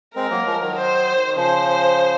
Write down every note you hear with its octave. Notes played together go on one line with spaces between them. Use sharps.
G#3 C4 A#4
F#3 A#3
F3 G#3
D#3 F#3
C5
D#3
C#3 F3 C5